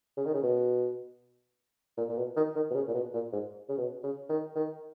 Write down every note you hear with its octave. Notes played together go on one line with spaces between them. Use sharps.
C#3
D#3
C#3
B2
A#2
A#2
B2
D#3
D#3
B2
C#3
A#2
B2
A#2
G#2
C#3
B2
C#3
D#3
D#3